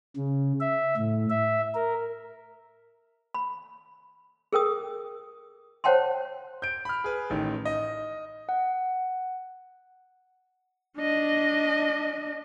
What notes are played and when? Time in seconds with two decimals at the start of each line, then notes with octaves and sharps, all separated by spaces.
0.16 C#3
0.61 E5
0.97 A2
1.30 E5
1.75 A#4
3.34 B5
4.53 G#4 A#4 G5 D#6
5.84 C5 C#5 F#5 G5 A5 C6
6.62 G6 D7
6.85 B5 F6
7.04 G#4 B4
7.30 A1 D#3
7.65 D#5
8.49 F#5
10.98 D4 D#5